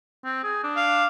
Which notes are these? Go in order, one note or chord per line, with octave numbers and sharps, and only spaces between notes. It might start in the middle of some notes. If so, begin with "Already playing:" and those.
C4
G#4
D4
F5